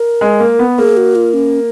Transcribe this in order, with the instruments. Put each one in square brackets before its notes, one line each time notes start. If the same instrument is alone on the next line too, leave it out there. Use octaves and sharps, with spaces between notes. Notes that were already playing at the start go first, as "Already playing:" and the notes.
Already playing: [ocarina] A#4
[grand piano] G#3
A#3
B3
[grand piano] A#3 [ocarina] G#4
[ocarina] F#4
F4
C#4